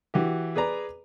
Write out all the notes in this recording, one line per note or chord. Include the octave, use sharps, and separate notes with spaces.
E3 F#4 G4
G#4 B4 D5 A#5